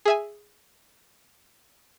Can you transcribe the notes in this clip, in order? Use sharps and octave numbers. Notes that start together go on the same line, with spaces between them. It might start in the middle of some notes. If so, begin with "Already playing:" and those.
G#4 E5 G#5